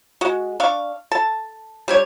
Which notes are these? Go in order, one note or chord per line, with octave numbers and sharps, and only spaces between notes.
G#3 F#4
D4 F5 C#6
A4 A5
G3 D4 C#5